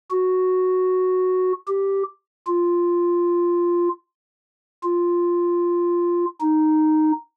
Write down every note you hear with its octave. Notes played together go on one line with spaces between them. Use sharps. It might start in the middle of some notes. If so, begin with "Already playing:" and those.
F#4
G4
F4
F4
D#4